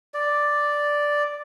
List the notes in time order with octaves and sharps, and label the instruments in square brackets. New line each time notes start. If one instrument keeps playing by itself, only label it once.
[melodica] D5